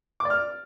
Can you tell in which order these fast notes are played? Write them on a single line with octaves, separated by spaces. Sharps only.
D6 D5 F6